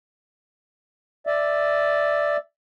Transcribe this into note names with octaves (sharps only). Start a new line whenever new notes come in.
D5 E5